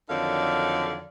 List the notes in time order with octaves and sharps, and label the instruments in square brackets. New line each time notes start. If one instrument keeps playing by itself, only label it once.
[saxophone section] F2 D3 D#3 F#3 D5 F5